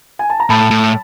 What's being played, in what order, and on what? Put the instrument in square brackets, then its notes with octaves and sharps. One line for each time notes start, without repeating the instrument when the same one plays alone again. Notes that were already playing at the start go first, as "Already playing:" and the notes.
[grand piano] G#5
A5
A#5
[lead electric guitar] A2 [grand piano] A5 B5
[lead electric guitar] A2